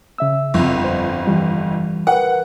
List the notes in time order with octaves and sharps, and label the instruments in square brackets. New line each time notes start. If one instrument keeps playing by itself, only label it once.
[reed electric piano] C#3 E5 E6
[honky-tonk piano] G1 F2
[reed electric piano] C5
E3 G3
[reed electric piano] A#4 B4 [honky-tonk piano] F#5